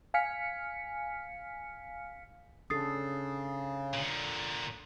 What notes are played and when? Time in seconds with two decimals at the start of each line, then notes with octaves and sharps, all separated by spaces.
0.14 F5 G#5 F6 B6 C#7
2.70 C#3 D4 A4 D#6 A6 C7
3.93 A#2 D3